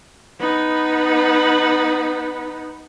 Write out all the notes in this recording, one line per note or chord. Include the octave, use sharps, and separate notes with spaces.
B3 D#4